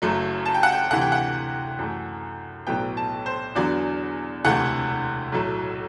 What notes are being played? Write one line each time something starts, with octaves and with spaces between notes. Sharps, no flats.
F#1 F#2 F#3 A3
A5
G5
F#5
G5
D2 C3 E3 F#5
G5
F#5
F#2 E3 A3
B1 A2 F#3 B3 G5
A5
C5
E2 D3 F#3 B3 D5
E1 D2 C3 E3 A3 F#5
B1 A2 F#3 A3